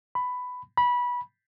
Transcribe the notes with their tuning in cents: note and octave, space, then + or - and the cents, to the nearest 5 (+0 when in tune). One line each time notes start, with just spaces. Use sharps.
B5 +10
B5 -20